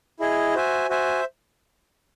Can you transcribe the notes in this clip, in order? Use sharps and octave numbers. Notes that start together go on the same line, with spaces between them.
E4 G#4 D#5
F#4 C5 E5 G#5
F#4 C5 E5 G#5